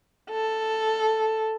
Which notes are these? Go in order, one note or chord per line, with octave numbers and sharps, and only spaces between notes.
A4